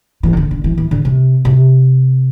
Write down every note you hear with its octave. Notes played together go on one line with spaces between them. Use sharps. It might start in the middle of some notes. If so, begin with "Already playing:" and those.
E3
C3
D3
D3
E3
E3
D3
C3
C3